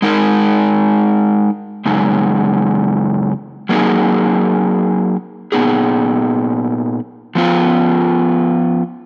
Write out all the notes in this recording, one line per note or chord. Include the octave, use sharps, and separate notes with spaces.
G#3 D#4 A#4
F#2 C#3 G#3 D#4
F#3 A#3 D#4 G#4
A#2 F3 B3 D#4 G#4
F3 B3 F4